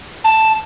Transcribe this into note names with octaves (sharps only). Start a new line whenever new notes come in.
A5